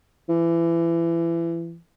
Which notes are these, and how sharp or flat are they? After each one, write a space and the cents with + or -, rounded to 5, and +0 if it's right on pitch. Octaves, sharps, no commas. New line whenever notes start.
E3 +25